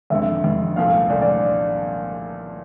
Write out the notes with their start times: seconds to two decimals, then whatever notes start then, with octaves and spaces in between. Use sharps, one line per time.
0.10 F1 F2 D3 E5
0.44 F1 F2 D3
0.76 C2 A#2 F3 A3 F5
1.10 C2 A#2 F3 A3 D5
1.21 D5